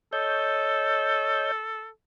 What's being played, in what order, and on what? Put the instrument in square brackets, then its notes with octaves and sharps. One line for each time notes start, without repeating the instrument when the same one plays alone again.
[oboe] A4 [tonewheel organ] C#5 D#5 G6